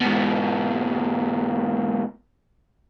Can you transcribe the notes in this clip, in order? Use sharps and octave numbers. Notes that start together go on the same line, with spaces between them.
G#2 B2